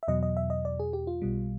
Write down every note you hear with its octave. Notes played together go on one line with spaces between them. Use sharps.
E5
E2 B2 F#3 D#5
D#5
E5
D#5
D5
G#4
G4
F4
B1 B2 G3